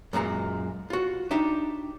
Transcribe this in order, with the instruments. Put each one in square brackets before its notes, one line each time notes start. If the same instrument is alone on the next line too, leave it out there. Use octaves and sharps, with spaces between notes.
[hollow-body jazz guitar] F#2 A#2 G#3 A#5
F4 F#4
D4 D#4 G4 E5